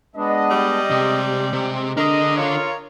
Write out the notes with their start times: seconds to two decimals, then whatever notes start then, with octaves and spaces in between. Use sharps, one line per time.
0.16 G#3 B3 D4 D#5
0.50 G3
0.90 C3 G#3
1.53 C3
1.97 D3 D4 A#4 D#5
2.36 F4 C#5